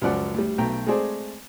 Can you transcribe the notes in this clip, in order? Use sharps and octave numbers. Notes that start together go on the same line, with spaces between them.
C#2 F#2 F3 D5 F#5
D2 G3
B1 B2 A3 G5 A#5
G#3 A3 C4 G#4 C5 D5